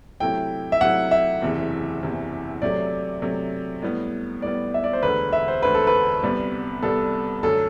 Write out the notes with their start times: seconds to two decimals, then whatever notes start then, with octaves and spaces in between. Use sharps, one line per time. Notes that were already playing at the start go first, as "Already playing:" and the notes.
0.20 C3 F#3 A3 E4 G5
0.72 E5
0.81 C3 F#3 A3 E4 F#5
1.11 E5
1.41 F#1 E2 C3 E3
2.01 F#1 E2 C3 E3
2.62 C3 F#3 A3 D5
3.22 C3 F#3 A3
3.82 A2 G3 B3
4.42 A2 G3 B3 D5
4.74 E5
4.84 D5
4.93 C5
5.02 E1 D2 D3 B4
5.33 E5
5.48 C5
5.62 E1 D2 D3 B4
5.74 A4
5.87 B4
6.23 C2 C3 G3 B3
6.83 C2 C3 G3 B3 A4
7.43 F#2 D3 F#3 A3 A4